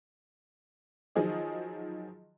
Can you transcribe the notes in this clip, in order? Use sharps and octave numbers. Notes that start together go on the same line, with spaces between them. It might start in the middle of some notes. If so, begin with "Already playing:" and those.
D#3 F3 F#3 G#4 D#5